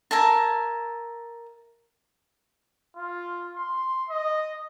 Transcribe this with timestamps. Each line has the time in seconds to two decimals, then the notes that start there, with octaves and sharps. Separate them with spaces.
0.11 A#4 E5 G#5 A5
2.96 F4
3.56 C6
4.09 D#5